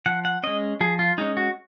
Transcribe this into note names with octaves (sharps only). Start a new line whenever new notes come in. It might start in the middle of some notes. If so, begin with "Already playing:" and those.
F3 F#5
F#5
G#3 C#4 D#5
F3 G#4
F4
G#3 C#4 D#4
F#4